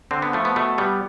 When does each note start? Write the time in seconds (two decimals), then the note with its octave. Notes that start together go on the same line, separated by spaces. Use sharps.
0.11 D3 C4
0.22 B3
0.33 F3 A3
0.45 B3
0.56 B2 A3
0.78 G3 B3